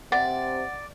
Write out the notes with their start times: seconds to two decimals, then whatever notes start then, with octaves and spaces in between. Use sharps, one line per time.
0.12 C3 D5 F#5